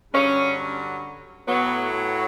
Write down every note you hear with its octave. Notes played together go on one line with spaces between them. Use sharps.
G2 D3 F#3 C#4
A2 F#3 B3